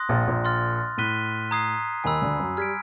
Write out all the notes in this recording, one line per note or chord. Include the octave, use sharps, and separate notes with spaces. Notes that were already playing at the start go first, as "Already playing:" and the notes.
Already playing: C6 D#6 F#6 A#6
A#1 A#2
A#1 A#2
C6 F6 A6
A2 F#6 B6 D#7 G7
A#5 D#6 G#6 C7
D#2 D#3 G#5 B5 E6
D2 D3
F#2 F#3
G3 F6 G#6 B6 D7